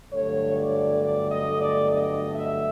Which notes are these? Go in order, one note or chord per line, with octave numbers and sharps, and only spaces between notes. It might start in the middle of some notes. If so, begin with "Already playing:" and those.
G1 G2 D3 F#3 A3 C#5
D5
D5
D#5
D5
D#5
E5